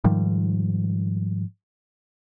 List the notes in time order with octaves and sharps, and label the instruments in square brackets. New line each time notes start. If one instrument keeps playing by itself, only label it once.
[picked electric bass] G#2 D#3 F3 G3